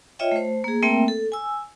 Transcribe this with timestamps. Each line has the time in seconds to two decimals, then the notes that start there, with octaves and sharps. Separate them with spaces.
0.19 F4 C#5 D#5 E5 G5
0.32 A3 C5
0.64 A#3 G#4
0.82 A3 A#3 C4 A#4 E5 G5
1.08 A4
1.32 G#5 E6